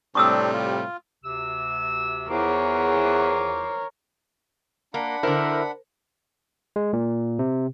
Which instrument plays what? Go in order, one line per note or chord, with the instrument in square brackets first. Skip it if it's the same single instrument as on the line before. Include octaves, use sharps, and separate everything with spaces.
[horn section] A2 C3 G3 [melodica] C4 D4 [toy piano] C#6 D#6 E6
[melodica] F4
[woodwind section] D2 C3 E6
[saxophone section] E2 [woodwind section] F4 C5 D6 [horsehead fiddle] A#4 C#5
[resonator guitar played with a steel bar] A#3 [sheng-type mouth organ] D4 F#5 B5
[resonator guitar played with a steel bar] D3 E4 [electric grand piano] A#4 C5
[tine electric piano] G#3
A#2
C3